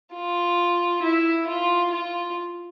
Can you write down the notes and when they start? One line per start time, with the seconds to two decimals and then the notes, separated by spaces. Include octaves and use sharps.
0.13 F4
1.02 E4
1.47 F4
1.91 F4